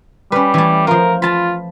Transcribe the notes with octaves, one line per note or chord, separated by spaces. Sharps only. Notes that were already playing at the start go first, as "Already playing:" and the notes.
G3 C#4 B4
E3 A3
F3 F4 A#4
F4 A5 B5